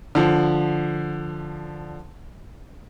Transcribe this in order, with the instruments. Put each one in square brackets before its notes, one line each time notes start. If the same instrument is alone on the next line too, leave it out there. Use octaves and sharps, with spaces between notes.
[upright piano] D3 F3